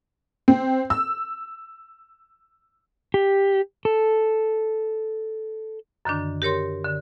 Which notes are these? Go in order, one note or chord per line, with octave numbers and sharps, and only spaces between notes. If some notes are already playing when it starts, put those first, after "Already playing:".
C4
E6
G4
A4
F#2 D3 D#3 D4
G4 A#4 C#5 C6
D3